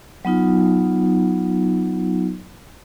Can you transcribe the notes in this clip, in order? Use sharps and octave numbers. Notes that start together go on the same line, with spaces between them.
F#3 B3 D#4 F4